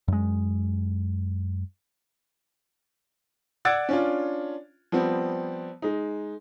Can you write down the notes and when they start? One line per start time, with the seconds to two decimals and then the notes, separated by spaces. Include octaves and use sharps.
0.08 F#2 G#3
3.65 D5 F#5 E6 G#6 A6 D7
3.89 C#4 D4 F4
4.92 F3 G3 B3 C4
5.82 G#3 D#4